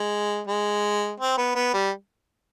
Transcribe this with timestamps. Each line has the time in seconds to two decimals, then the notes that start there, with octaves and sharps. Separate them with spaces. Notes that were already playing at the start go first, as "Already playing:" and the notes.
Already playing: G#3
0.47 G#3
1.20 C4
1.38 B3
1.55 B3
1.74 G3